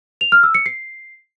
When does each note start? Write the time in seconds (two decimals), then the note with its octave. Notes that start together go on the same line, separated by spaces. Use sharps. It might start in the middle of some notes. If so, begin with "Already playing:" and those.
0.21 F7
0.32 F6
0.43 E6
0.55 C#7
0.66 C7